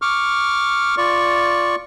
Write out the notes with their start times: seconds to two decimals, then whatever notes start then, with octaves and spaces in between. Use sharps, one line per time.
0.02 C#6 D6 F6
0.97 F4 D5 C#6